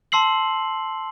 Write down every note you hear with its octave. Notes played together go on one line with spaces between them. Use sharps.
A5 C6 E6 C7 F#7